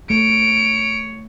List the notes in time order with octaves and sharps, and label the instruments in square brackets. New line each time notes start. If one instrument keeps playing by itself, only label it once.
[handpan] A3 [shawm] C#5 [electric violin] D7